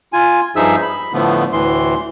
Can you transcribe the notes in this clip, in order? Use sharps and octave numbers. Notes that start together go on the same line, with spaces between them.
F4 G#5
G2 F3 D#4 G#4 E5 E6
B5
A2 D3 F3 A3 B3
D2 A2 E3 C6